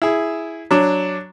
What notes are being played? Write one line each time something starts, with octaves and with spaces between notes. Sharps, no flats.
E4 G#4
F#3 D4